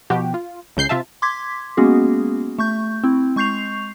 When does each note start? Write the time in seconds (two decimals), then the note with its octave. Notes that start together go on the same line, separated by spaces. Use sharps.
0.10 B2 F3 F#4 G4
0.34 F4
0.77 C#2 C#3 G6 C7
0.89 C3 F4 E5 A5
1.22 C6 D6 G#6 B6
1.77 G#3 A#3 B3 C#4 F#4 G#4
2.59 A3 C#6 G6
3.04 C4 E4
3.36 G#3 C#6 G6 C7 F7